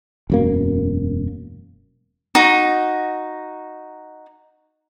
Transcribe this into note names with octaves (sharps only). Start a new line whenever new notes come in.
E1 F#2 A#3
D#4 F#4